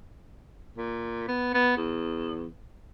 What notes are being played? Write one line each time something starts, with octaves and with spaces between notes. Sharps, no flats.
A#2
B3
B3
E2